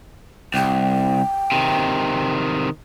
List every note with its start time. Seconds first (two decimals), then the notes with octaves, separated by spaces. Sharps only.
0.54 C2 G5
1.52 C3 D#3